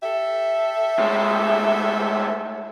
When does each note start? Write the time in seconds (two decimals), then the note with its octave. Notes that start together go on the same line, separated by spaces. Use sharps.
0.03 G4 A4 E5
0.99 A2 G#3